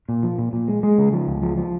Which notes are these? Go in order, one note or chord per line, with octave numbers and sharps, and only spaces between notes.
A#2
F3
A#2
A#2
G#3
G#3
C#3
F3
C#2
F3
F3